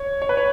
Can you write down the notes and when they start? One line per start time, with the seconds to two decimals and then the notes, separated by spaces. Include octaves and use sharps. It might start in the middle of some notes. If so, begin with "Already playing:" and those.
Already playing: C#5
0.22 C#5
0.29 B4
0.37 C#5